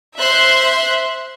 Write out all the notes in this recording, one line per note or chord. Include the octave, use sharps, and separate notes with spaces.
C5 E5 C6 F#6